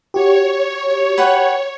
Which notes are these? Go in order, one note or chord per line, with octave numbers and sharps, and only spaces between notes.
F#4 G4 C#5
B4 F#5 G5